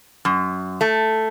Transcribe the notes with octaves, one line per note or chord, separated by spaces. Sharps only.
F#2
A3